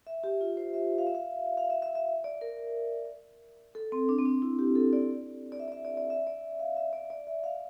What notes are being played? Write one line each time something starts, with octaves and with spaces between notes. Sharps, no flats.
E5
G4
F4
C5
E5
F5
E5
F5
F5
E5
E5
E5
D5
A#4
A4
C4
D4
C4
D4
E4
G4
A4
D5
D5
E5
D5
E5
D5
D5
E5
D5
F5
E5
D5
D5
E5
F5